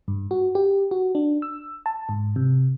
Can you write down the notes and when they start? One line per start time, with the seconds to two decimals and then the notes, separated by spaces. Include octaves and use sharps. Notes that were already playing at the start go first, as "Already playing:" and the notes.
0.08 G2
0.31 F#4
0.55 G4
0.91 F#4
1.15 D4
1.42 E6
1.86 A5
2.09 G#2
2.36 C3